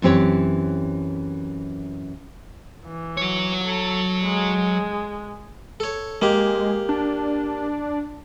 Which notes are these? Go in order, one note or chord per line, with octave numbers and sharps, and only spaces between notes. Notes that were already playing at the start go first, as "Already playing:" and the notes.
F#2 E3 C4 G4 C#5
E3
F#3 C#5
A4
G#3
A4 C#5
G#3 A#3 G4
D4